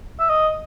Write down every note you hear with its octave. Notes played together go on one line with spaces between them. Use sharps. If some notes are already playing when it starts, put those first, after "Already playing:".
E5
D#5